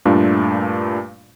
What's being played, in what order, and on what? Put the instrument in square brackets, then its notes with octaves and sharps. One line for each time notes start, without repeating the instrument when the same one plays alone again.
[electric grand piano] G2 A#2 A3 D4 F4